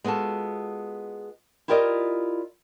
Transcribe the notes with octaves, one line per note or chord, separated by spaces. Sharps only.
G#3 B3 F4 F#4 A4
E4 F4 G4 A#4 D5 D#5